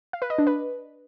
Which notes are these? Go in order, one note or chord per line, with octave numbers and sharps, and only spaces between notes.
F5
B4
D#5
D4
B4